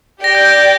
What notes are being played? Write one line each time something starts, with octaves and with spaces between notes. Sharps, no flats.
G4 D5 G5 A#6
G6
A#6